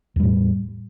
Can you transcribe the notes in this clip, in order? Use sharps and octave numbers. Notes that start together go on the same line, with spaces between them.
E2 A2 G3